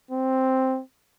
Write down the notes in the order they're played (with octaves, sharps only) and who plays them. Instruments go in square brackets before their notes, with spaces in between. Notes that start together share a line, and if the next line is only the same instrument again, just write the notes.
[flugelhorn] C4